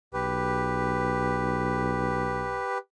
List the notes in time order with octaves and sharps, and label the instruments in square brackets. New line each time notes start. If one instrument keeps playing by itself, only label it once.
[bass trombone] B1 [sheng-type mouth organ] G4 B4